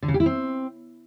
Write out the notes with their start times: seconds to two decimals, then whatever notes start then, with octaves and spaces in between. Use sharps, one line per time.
0.03 D3
0.08 C#3
0.14 G4
0.20 E4
0.26 C4